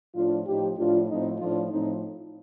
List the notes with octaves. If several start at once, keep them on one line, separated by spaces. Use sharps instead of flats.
A2 F3 D4 F4
A2 F3 D#4 G4
A2 F3 D4 F4
A2 F3 C4 D#4
A2 F3 D4 F4
A2 F3 C4 D#4